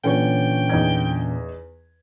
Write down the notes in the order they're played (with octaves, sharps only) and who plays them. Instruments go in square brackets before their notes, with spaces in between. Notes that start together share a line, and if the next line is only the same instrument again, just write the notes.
[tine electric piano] A#2 E3 C#4 [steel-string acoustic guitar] D3 C#5 [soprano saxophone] G5
[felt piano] E2 D#4 G#6